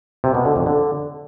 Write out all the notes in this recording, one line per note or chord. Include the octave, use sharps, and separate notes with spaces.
C3
B2
D3
F2
D3